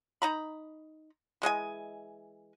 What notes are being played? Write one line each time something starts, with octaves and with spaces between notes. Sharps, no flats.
D#4 A#5 B5
E3 G#3 D#5 G#5